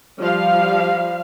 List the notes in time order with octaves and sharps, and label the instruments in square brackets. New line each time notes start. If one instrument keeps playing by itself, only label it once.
[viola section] F3 G3 F5